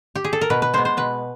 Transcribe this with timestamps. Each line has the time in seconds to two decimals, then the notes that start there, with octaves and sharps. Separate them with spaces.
0.15 G4
0.24 G#4
0.33 A4
0.41 A#4
0.50 B2 B4
0.62 B4
0.74 G#3 B3 C5
0.85 C5
0.97 B2 B4